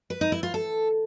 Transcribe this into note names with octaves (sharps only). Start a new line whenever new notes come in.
B4
D#4
E4
F4
A4